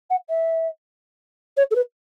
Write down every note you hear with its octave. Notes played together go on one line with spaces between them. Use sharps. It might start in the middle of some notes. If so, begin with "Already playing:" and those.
F#5
E5
C#5
A4
B4